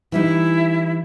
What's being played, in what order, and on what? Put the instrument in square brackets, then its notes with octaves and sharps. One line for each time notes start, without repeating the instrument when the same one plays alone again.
[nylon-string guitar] E3 G3 D#4 [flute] E4